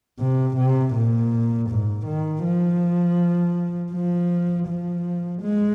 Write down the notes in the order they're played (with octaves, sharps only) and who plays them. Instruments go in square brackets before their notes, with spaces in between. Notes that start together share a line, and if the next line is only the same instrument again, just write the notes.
[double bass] C3
C3
A#2
G#2
D#3
F3
F3
F3
G#3